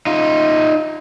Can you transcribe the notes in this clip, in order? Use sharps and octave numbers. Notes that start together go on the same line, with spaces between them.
D#4 F4